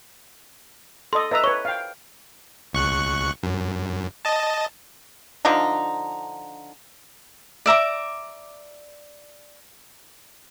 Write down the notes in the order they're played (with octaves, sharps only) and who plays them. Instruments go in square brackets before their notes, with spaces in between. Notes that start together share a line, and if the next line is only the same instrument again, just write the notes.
[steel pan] A4 D#5 [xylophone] C6 D#6
[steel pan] B4 E5 A#5 [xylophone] D#5 E6
[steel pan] B4 C#5 [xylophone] C#6
[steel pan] F5 G5
[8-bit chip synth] C#2 C#6 F#6
F#2
D#5 A5
[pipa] D3 F3 D4 D#4
[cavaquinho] D5 E5 A#5 D6